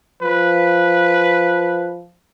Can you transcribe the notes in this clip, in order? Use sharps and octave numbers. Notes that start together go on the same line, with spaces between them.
F3 B4